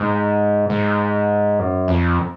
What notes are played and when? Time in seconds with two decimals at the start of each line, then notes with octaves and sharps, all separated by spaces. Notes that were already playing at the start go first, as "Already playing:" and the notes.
Already playing: G#2
0.70 G#2
1.59 F#2
1.88 F2